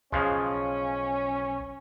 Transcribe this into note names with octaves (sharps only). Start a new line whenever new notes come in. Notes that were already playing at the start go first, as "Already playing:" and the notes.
B1 C#3 F3 G#3 C#4